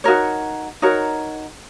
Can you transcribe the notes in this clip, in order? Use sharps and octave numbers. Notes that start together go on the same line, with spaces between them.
D#4 F#4 A#4 C#5
D#4 F#4 A#4 C#5